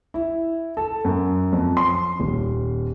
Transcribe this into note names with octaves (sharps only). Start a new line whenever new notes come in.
E4
A4
F#2
F2
C6
D#1